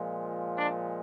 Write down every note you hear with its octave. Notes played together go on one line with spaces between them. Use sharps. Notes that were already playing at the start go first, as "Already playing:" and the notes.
Already playing: A#2 F3 G#3
D4